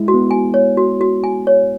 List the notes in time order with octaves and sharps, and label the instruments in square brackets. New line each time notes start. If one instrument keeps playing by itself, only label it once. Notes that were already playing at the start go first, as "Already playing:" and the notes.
Already playing: [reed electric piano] G#3 E4
[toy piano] F#4
[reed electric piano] B3
[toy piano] G#5
C#5
F#4
F#4
G#5
C#5